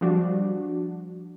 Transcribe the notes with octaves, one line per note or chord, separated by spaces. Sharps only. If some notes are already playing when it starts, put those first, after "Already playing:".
F3 G3 D4 F#4